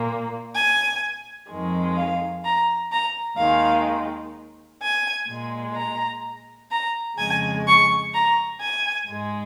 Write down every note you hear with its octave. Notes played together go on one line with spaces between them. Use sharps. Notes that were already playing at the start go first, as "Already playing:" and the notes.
Already playing: A#2 A#3
G#5
F2 D#3 G#3
F5
A#5
A#5
D#2 D#3 G#3 F5
G#5
A#2 G#3
A#5
A#5
F2 C#3 G#3 G#5
C#6
A#5
G#5
G#2 G#3